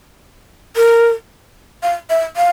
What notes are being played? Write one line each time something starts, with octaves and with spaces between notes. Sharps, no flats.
A#4
F5
E5
F5